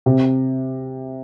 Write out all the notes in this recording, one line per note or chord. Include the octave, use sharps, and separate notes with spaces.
C3